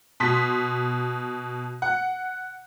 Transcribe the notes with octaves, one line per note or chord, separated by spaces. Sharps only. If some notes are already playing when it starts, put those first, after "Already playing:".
B2 C6 B6
F#5